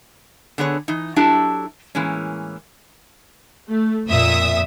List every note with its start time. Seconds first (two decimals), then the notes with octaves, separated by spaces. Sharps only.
0.58 D3 B3 G#4 C#5
0.88 E3 D#4
1.16 F#3 D4 E4 F#4 G4 A4
1.95 A2 E3 G#3 A#3 C#4
3.68 A3
4.07 F2 A#2 E5 D#6